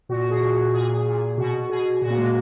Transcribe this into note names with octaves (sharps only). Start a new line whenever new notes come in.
A#2 F#4
F#4
G#4
A#2 F#4
A#2 G#4
A#2
B2 F#4
B2 G#4
A#2 F#4
A#3
G#3